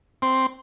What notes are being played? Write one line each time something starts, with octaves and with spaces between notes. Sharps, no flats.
C4